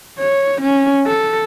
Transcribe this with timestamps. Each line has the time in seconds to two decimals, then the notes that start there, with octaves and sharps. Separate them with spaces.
0.19 C#5
0.61 C#4
1.07 A4